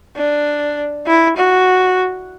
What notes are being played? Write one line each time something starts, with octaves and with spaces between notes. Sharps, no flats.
D4
E4
F#4